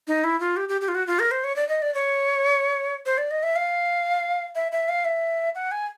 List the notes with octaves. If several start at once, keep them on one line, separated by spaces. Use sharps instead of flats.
D#4
E4
F4
G4
G4
G4
F4
F#4
F4
A#4
C5
C#5
D5
D#5
D5
C#5
C5
D5
D#5
E5
F5
E5
E5
F5
E5
F#5
G#5